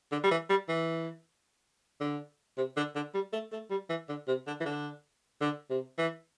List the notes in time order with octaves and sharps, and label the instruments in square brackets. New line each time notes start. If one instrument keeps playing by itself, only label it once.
[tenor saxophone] D3
G3
E3
G3
E3
D3
C3
D3
D3
G3
A3
A3
G3
E3
D3
C3
D3
E3
D3
D3
C3
E3